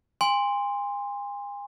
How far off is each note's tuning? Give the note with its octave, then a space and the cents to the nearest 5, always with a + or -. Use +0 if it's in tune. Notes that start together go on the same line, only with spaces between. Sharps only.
G#5 -40 C6 +0